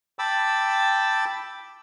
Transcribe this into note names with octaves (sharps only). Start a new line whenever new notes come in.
G5 A5 B5 D6 E6